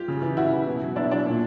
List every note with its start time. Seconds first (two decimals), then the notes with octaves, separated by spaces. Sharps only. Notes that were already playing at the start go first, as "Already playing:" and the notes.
Already playing: F4 G4
0.08 C#3
0.22 E3
0.37 C#3 E4 F#4
0.52 E3
0.67 B2
0.81 F#3
0.96 B2 D4 E4
1.11 F#3 D4
1.26 A#2